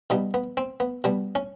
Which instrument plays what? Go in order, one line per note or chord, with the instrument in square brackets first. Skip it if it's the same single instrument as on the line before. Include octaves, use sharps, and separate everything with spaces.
[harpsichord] B2 G3 B3 D#4
B3
C4
B3
B2 G3 B3
C#4